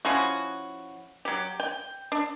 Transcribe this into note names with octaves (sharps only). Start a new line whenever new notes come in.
F3 C#4 E4 F#4
F#3 G4
G5
D4